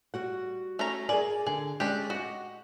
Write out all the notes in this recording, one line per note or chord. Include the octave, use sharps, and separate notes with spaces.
G3 F#4 F#5
A3 C#4 A#5
G#4 A#4 D5 G#5
D3 G#4
G#3 C#4 D4 G4
F#4 D#5 F#5